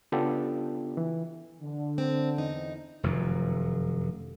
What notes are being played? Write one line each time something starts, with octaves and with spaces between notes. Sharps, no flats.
C#3 B3 D4 F4 G4 A4
E3
D3
C4
E2 D#4
F1 F#2 D#3